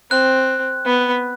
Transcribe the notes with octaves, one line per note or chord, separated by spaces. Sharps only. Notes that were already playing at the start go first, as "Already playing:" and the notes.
C4 F#6
B3